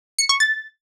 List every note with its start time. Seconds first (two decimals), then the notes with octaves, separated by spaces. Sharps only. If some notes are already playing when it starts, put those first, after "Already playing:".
0.18 C#7
0.29 C#6
0.40 A6